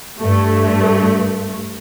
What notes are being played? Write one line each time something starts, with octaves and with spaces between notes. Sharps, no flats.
G2 A3